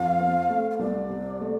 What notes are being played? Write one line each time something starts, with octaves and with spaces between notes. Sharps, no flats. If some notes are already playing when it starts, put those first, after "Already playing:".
Already playing: F2 F5
C4
A3
F5
C2 D5
C3
A3